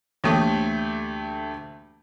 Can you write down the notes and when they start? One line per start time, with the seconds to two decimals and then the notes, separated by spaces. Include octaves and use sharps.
0.24 D2 E3 A3 A#3 F#4 G4